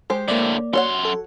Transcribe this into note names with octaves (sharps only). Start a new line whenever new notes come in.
G#3 G4 C5
A2 D3 A#3 D5
F#2 F#4 C#5 F#5 C6
A4